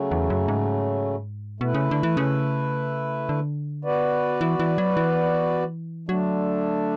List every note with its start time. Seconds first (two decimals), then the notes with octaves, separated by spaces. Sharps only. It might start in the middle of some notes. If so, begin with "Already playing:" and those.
Already playing: C#3 F#3 A3
0.11 E2
0.30 F#2
0.48 G#2
1.60 B2 A3 E4 B4
1.74 C#3
1.91 D3
2.03 E3
2.17 C#3
3.29 D3
3.85 B3 F#4 B4 D5
4.41 E3
4.59 E3
4.78 F#3
4.97 E3
6.08 D3 F#3 A3 D4